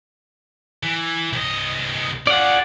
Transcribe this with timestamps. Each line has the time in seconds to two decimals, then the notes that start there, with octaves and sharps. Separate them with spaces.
0.83 E3
1.33 C2 D#5
2.27 F4 G#4 D5 F#5